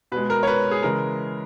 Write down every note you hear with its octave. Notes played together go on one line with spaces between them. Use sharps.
B2 G#3 B4
A#4
C#5
B4
G#4
C#3 E3 G#3 A#4